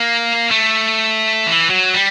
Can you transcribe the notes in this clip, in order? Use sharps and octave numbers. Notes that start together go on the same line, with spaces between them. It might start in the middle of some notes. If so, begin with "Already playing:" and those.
Already playing: A#3
A3
E3
F#3
G3